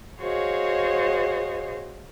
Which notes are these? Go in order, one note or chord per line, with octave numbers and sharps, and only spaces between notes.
F#4 G#4 C5 C#5 D#5 F5